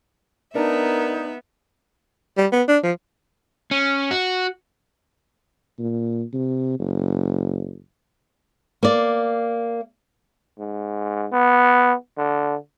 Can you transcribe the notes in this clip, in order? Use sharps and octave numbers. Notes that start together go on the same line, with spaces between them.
B3 D4 D#4 A#4 E5
G3
B3
D4
F3
C#4
F#4
A#2
C3
F#1
A#3 D5
G#2
B3
D3